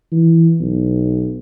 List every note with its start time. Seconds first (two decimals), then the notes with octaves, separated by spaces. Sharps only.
0.12 E3
0.60 B1